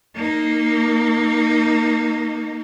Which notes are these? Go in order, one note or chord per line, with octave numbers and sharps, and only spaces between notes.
A#3 D#4